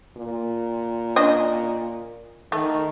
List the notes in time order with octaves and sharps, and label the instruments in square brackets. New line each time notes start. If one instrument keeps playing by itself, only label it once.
[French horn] A#2
[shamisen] C#4 D4 D#5
[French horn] D#3 [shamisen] A3